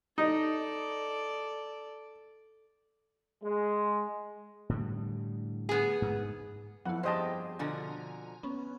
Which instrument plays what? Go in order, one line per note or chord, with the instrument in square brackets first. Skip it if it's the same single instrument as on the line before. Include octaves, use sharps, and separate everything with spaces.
[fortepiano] D#4 [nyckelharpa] A4 D5
[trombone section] G#3
[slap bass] A2 D3 G3
[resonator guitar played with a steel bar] B3 G#4
[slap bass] G#2
[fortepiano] F2 [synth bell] B3 E4 [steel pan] F#5
[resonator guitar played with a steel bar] G2 G4 [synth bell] G#4 [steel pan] C5 D#5 A5
[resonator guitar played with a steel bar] B2 D3 F3 [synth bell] G#5 A#5
[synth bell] B3 C#4